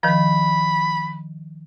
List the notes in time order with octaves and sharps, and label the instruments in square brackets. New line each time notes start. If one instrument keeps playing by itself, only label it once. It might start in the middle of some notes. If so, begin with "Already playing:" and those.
[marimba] D#3 F3 [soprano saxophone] B5